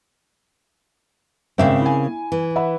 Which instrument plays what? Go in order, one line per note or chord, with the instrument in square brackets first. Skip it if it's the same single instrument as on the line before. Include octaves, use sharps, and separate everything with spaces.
[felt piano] G#1 E5 G5 [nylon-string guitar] C#3 A#3 C4
[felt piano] E4 G#5
[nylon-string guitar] E3
[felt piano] E5 F#5 B5